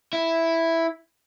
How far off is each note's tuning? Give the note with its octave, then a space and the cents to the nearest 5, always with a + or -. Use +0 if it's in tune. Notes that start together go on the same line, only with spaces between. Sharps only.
E4 +0